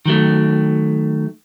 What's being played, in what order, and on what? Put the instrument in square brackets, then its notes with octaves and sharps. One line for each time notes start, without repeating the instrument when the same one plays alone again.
[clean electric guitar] D#3 F#3 A3